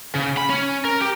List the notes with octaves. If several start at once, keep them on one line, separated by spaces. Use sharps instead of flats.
C#3
B5
C#4
A#4
G4